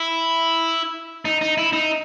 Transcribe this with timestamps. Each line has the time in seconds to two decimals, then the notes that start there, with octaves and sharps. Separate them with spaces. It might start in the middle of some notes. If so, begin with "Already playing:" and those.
Already playing: E4
1.25 D#4
1.41 D#4
1.58 E4
1.73 D#4